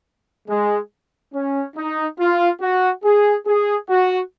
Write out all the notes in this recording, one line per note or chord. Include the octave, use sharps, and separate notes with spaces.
G#3
C#4
D#4
F4
F#4
G#4
G#4
F#4